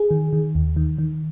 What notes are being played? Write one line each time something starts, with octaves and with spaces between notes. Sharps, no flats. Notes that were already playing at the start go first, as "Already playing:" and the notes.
Already playing: G#4
D#3
D#3
D#2
D#3
D#3